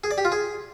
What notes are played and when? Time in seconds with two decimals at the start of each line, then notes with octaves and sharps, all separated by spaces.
0.04 G#4
0.11 D5
0.18 G4
0.25 F4
0.32 G#4